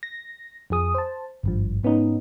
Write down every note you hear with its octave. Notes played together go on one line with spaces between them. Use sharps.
A#6
F2 F3 G#4 D#6
C5 A5
G#1 G2 F3
G#2 B3 C#4 D#4